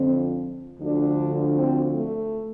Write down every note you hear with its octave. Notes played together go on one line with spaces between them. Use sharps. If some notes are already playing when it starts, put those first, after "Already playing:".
Already playing: F2 D3 F3 C4
D2 D3 F3 D4
C4
A3